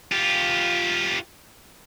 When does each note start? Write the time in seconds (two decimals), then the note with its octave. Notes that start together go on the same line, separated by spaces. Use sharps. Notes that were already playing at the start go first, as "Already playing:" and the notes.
0.12 F4 G4